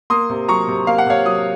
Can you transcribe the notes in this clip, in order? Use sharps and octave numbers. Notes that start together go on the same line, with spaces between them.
A#3 C6 D#6
C3
F#3 A#5 C#6
C3
A#3 F5
F#5
C3 C#5 F5
F#3 D#6